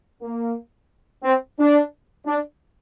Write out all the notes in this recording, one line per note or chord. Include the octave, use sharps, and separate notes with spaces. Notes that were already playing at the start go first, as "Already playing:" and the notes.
A#3
C4
D4
D4